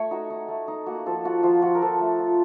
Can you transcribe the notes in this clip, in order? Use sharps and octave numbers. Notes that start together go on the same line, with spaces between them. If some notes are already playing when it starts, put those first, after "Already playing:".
Already playing: A3 C#5
D#4 F#4
D#4
A3
D#4
A#3 F#4
F3 A4
F4 F#4
F3 F4
F3 F#4
A#4
F3 A4
A3
F4